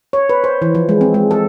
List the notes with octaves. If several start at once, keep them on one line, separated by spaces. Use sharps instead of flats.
C#5
B4
C5
E3
F3
G#3
C4
G#3
A4